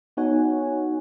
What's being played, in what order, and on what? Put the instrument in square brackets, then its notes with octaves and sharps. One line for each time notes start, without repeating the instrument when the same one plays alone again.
[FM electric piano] B3 D#4 F#4 C#5 F#5 G#5